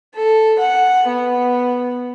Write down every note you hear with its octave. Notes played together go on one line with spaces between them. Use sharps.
A4
F#5
B3